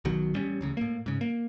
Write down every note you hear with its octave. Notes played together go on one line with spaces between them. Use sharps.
B1 B2 D#3 F#3
A1 G3 C#4
D1 A1 C#3
A2 A#3
G#2 C#3
A#3